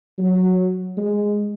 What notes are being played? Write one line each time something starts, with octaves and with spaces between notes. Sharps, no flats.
F#3
G#3